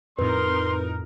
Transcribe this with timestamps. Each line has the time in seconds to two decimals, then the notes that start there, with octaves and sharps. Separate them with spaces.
0.19 F2 A2 D#4 A#4 B4 C6